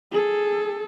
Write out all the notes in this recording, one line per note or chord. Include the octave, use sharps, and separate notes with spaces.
G#4 A4